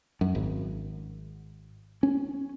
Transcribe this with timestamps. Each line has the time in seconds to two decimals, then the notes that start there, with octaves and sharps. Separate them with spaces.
0.21 F#2
0.35 G#1
2.03 C#4